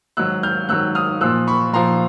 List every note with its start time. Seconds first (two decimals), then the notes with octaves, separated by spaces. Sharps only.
0.17 G#2 D#3 F#3 E6 F#6
0.43 F6 G6
0.69 G#2 D#3 F#3 E6 F#6
0.95 D#6 F6
1.21 A#2 F3 E6 F#6
1.47 B5 C#6
1.73 A#2 F3 A#5 C6